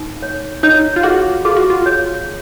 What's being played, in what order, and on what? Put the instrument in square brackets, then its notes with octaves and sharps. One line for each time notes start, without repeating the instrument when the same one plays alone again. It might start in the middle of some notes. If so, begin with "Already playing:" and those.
Already playing: [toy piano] D#4
C#5
[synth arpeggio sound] D#4 [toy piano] C#5
[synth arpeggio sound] F4
[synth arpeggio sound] F#4 [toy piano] G#4
[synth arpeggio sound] F4 [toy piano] G#4
[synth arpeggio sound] F#4
F4
[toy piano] C#5